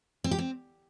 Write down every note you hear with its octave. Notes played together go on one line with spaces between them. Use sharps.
C4
G4
C4